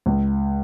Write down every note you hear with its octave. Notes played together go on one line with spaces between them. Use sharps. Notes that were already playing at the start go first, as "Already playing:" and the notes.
C#2